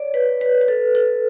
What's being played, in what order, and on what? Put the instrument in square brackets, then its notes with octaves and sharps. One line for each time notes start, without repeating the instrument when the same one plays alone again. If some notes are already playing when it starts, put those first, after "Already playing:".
Already playing: [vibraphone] C#5 D5
B4
B4
B4
A4
A4